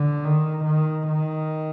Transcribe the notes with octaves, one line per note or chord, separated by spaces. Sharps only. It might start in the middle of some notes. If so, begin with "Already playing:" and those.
Already playing: D3
D#3
D#3
D#3